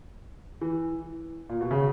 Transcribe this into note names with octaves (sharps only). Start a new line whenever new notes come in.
E3
A#2
B2
C#3